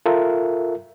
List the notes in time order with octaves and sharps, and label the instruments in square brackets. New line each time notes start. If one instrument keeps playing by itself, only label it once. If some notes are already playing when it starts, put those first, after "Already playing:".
[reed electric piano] F4 A4 A#4 E5